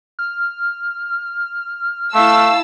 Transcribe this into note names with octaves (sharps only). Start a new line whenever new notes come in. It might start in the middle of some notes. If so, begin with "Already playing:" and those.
F6
A3 E4 F5 A5 E6